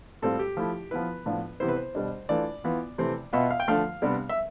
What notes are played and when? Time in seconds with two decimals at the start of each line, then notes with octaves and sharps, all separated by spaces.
0.22 A2 G3 C4 F4 A4
0.39 G4
0.57 F3 A3 E4
0.91 F3 B3 E4 B4
1.26 A2 F3 B3 D4 F4
1.60 C3 E3 B3 E4 C5
1.69 B4
1.76 C5
1.95 B2 G3 D4
2.29 E3 A3 D4 F4 D5
2.64 E3 B3 F4
2.98 C3 E3 A3 C4
3.33 B2 B3 F4 E5
3.51 F5
3.60 G5
3.68 D3 F3 A3 F5
4.02 C3 G3 B3 D4
4.29 E5